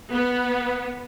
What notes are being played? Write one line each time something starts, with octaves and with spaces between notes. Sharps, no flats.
B3